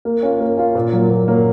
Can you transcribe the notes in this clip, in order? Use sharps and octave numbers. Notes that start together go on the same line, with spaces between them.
A#3
C#4 F4
A#3
C#4 F4
A#2
F#3 A#3
A#2
F#3 A#3